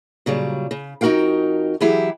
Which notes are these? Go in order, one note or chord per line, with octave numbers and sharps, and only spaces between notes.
A#2 C#3 F#3 G3
C#3
F2 D#4 F#4 A#4 F5 G5
E3 F#3 E4 G4 G#4